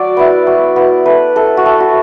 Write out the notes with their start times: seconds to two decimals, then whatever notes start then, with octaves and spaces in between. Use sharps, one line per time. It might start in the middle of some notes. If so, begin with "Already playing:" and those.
Already playing: F#3 D5
0.17 B3 E4
0.47 F#3
0.76 B3 E4
1.06 A3 B4
1.35 E4 A4
1.57 F#4
1.66 A3 A4
1.80 F#4